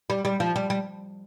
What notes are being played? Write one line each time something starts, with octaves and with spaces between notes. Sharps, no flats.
G3
G3
F3
G3
G3